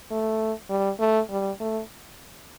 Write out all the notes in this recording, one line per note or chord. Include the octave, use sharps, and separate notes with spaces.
A3
G3
A3
G3
A3